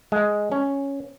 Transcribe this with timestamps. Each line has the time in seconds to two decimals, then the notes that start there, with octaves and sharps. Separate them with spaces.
0.12 G#3
0.52 C#4